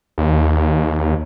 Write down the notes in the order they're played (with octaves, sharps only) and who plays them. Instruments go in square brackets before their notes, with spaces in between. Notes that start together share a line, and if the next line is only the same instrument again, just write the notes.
[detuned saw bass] D#2